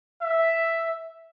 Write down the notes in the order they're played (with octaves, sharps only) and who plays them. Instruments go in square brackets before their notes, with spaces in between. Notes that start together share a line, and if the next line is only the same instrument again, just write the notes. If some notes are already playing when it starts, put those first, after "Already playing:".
[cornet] E5